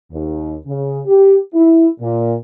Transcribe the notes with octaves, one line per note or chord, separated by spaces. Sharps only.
D#2
C#3
G4
E4
A#2